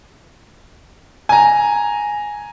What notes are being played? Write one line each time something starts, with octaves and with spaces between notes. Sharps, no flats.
G#5 A#5